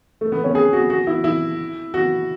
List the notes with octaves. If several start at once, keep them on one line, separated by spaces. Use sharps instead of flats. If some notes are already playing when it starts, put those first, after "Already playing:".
A3
B3
C#4
G#4
F#4
F#4
E4
E4
F#4